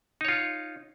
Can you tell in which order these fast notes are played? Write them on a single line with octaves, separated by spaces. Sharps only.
D#4 C#5 F4